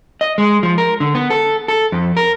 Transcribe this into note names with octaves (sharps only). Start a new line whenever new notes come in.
D#5
G#3
F3
A#4
D3
B3
A4
A4
F2
A#4